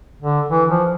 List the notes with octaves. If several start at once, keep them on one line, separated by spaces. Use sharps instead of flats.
D3
E3
F3